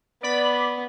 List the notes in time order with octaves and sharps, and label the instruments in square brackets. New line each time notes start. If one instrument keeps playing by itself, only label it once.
[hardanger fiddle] B3 [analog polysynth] D5 B5